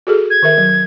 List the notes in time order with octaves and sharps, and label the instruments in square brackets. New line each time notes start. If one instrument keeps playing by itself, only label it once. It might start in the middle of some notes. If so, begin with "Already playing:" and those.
[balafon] F#4 G#4 A4
[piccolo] G#6
[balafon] D#3 A#4 E5
F#3